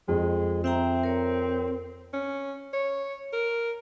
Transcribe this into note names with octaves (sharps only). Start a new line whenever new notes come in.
F2 G#3
C4 E5 G5 A#5
A#4 C#5
C#4
C#5
A#4